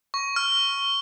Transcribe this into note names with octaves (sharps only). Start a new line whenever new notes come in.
C#6
F6